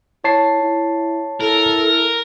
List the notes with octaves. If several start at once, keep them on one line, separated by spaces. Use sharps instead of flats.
E4 C#5 A5 C7
E4
E4 A4 A#4